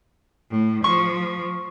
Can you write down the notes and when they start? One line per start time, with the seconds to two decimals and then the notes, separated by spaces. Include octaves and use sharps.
0.51 A2
0.84 F3 C#6